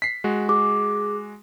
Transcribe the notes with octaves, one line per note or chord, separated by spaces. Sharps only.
B6 C7
G#3 F#4
G#4 D6